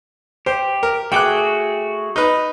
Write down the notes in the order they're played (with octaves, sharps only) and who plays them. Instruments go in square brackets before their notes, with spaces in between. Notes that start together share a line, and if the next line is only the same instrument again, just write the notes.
[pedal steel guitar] G4 [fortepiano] C5
[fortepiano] A#4
[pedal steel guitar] A3 F#4 G#4 [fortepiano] G5 D6 F#6
[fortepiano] D#4 B4